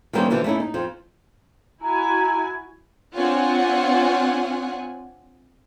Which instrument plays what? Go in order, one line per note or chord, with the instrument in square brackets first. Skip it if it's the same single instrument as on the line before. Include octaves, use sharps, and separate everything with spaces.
[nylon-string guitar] D#3 E3 G3 A#3 C4 C#4
B2 D3 E3 F3
A3 A#3 C#4 D#4 E4
D#4
F2 F3
[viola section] E4 F#4 G#5 [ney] A#5
[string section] C4 D4 F4 C#5 F#5 G#5